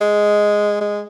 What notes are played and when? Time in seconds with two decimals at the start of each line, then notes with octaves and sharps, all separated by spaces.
0.01 G#3
0.81 G#3